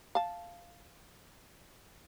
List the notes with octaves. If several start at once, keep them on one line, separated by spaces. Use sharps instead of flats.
F5 A5